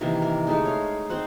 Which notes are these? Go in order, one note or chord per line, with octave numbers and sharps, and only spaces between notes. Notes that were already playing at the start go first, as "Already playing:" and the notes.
C3 D#3 E3 A#3
A#4
G#3 A3 D#4
C#5 F5
C4 D#4 C5 F#5